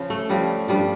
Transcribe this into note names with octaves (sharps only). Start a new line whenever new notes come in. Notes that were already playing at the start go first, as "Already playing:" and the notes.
Already playing: C#3 F3
A3
C#3 F3 G3
G2 F3 G3